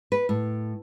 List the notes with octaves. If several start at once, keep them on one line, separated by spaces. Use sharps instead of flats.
B4
A2